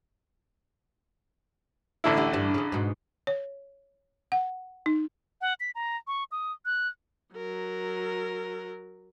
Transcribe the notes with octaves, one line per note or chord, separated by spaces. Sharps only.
A1 D3 E4
D2 F#4 G4
G2 D4
C#3 C#4
G#2 B2
C#5
F#5
D#4
F#5
B6
A#5
C#6
D#6
F#6
F#3 A#4